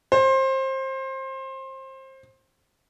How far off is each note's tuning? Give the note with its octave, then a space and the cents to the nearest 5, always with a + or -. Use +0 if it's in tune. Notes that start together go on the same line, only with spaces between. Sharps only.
C5 +25